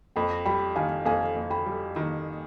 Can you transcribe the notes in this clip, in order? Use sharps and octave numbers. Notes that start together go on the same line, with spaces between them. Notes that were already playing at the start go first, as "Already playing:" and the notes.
F2 G5 B5
G3 G5 B5
D#3 F5 G#5
F2 F5 G#5
F2
G5 B5
G3
D#3